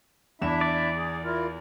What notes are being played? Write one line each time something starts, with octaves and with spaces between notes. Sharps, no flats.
E2 D4 E4 E5 E7
D5
G#4
E4 F4 A#4